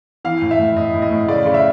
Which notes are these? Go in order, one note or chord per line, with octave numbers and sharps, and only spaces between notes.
E3 F5
A2
E5
A2
A2 D#5
A2
D#5
A2
C#3 D5
C#3
E5